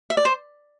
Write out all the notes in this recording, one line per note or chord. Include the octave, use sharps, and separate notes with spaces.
E5
D5
C5